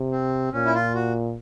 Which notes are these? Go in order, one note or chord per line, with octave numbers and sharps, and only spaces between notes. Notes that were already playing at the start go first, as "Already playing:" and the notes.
Already playing: C3
C4
A#2 C#4
E4
F4
F#4